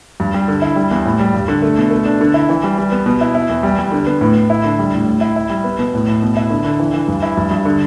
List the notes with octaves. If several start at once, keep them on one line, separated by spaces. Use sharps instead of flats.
G2
G3
D3
E4
G3
E2
A2
G3
G2
D3
A3
B2
A3
D4
D3
E4
E3
G3
G3
B3
B2
E4
E4
E2
G3
G3
D3
B3
A2
A2
E4
D3
G3
A2
A2
E4
E4
G3
B3
B2
A2
A2
B2
E4
D3
D3
E3
E3
G2
E4
G2
G2
D3